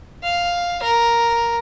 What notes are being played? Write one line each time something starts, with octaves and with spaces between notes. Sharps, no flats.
F5
A#4